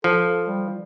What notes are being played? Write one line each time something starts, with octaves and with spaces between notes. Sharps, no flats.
F3 A4
G3